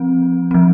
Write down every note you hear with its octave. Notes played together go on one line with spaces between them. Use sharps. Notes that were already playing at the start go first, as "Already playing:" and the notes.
Already playing: F3 C4
F3 C4